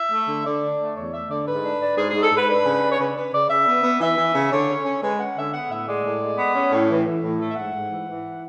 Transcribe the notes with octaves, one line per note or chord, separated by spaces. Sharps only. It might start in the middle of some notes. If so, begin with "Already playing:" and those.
Already playing: E5
A3
D3
D3 D5
D4
A3
E2 C#5
A3 E5
D3 D5
G#2 B4
D4
D4
G#2 G#4
G#2 G#4
A4
G#2 B4
D4 B4
C#3
D4
C#5
C#3 B4
C#3 B4
C#3 D5
C#3 E5
B3
B3
E3 E5
E3
C#3
D3 C#5
C#4
C#4
G#3 B4
C#4 F#5
D3 E5
B3 F#5
A2 E5
G#3 D5
A2
G#3
B3
C#4
A2
E3
E3
A2
A3
E5
G#2 F#5
G#2
E3
E3